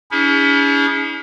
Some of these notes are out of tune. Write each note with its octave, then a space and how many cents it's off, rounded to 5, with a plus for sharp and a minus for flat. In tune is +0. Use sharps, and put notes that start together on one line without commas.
C#4 +40 E4 -35 G#4 -20